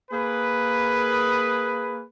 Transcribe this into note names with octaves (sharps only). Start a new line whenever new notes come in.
A#3 G#4 B4